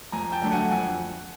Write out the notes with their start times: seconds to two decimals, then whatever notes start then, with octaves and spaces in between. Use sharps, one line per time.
0.12 F2 G#5 A#5
0.32 G5 A5
0.42 D3 F#3 A3
0.52 F#5 G#5
0.71 F2 F#5 G#5